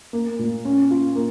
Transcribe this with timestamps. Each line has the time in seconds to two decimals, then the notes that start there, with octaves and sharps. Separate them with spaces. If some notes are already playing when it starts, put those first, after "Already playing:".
0.13 A#3
0.39 A#2
0.65 C#4
0.91 F4
1.16 A#3